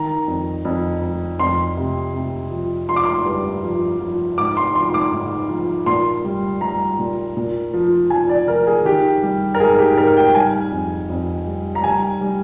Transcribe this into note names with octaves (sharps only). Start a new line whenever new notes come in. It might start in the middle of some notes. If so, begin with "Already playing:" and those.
Already playing: D#3 A#5
F2
F2
F2
F2 C6
C3
C3
F3
F3 C6
D6
C6
G2
F3
F3
G#2 D6
C6
F3 C6
C6
D6
G#2
F3
A#2 C6
G3
G3 A#5
A#2
A#2
F3
F3 G#5
D5
F3 A#4
G#4
D#3 G4
G3
A#4
G#2 G#4
G4
G#2 A#4
G5
G3 G#5
F2
F2
G3
A#5
G3 G#5
G3